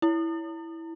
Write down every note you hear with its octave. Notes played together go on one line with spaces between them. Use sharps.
E4